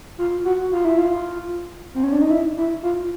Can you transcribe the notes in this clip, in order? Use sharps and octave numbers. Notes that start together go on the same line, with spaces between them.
F4
F#4
F4
E4
F4
C4
C#4
D4
D#4
E4
E4
F4